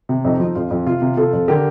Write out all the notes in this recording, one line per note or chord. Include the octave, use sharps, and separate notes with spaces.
C3
F2 D#4
F3
F2 F4
F2
C3 F4
C3
C3 F4 A4
F2
D3 G4 A#4